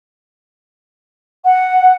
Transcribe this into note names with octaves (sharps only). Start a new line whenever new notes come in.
F#5